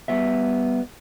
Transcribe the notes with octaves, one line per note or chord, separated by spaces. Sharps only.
G3 B3 E5